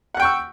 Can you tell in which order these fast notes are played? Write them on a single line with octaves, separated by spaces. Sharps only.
F#5 F#6 G5 C#6 E6